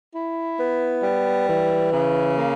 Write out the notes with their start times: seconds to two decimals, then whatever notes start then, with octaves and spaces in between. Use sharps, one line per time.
0.14 E4
0.59 B3
1.03 G3
1.48 E3
1.92 C#3
2.37 A#3